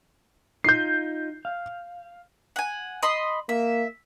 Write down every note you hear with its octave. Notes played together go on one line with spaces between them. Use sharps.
D#4 F4 G6 C7
F5
F#5 G#5
D#5 B5 C6
A#3 E5